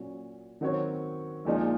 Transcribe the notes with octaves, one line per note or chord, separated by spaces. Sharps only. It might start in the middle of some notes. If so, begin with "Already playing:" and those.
Already playing: A#2 F#3 C#4
D#3 F#3 C4 F#4 C#5
A#1 A#2 F3 G#3 D#4